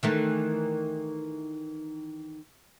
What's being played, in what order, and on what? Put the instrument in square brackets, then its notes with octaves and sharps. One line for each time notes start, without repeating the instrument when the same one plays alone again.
[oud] D#3 E3 A3